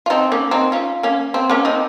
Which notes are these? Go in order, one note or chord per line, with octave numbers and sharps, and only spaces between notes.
F4
C4 D#4
A#3 C#4
C4 D#4
C#4 F4
A#3 C#4
C4
A#3 C#4
C4 D#4